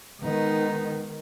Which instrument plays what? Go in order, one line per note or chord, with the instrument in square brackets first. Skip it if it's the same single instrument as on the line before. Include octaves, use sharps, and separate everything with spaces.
[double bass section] D#3 [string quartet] G#3 B3 D#4